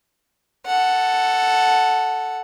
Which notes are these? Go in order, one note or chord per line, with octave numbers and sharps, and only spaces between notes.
A4 F#5